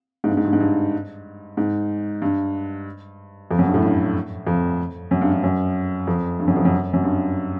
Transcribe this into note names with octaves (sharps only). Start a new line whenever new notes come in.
G#2
G2
G#2
G2
G#2
G2
G#2
G2
F2
F#2
G2
A2
G2
F2
F#2
G2
G2
F#2
F2
G2
F#2
F2
F#2
F#2
G2